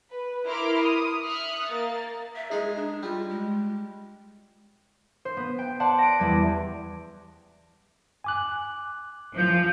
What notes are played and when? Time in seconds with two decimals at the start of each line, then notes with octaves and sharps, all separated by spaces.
0.11 B4
0.46 E4 A#4 C6 D6 F6 D7
0.82 D#6
1.23 E5 D#6 F6 F#6 C#7
1.68 A#3 A6
2.36 E5
2.51 G#3 D#4 G#4
2.76 D4
3.03 G3 F4
3.30 G#3
5.25 C5
5.37 B3
5.59 G5
5.80 D5 F#5 A5 C6
5.98 A#6 D7
6.19 E2 G3 G#6
8.24 G#5 D6 F#6
9.37 F3 G6